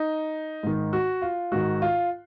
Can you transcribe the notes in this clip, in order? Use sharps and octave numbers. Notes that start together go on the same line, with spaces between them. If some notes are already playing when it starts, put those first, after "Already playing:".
Already playing: D#4
G#2 D#3
F#4
F4
G#2 D#3 F#4
F4